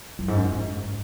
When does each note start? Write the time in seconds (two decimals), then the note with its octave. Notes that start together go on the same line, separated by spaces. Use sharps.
0.19 F#2
0.28 G#2
0.35 F#2
0.52 G#2